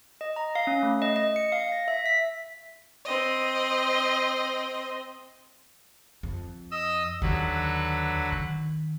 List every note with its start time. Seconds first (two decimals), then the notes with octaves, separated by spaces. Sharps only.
0.21 D#5
0.36 A#5
0.55 F5
0.67 C#4
0.83 A3
1.02 D#5
1.16 D#5
1.36 C#7
1.52 F5
1.72 A#6
1.88 E5
2.06 B6
3.05 C4 D#5
6.23 F2
6.71 D#5 D#6 E6
7.22 D#2 D3 D#3 F#3 B4
8.32 D#3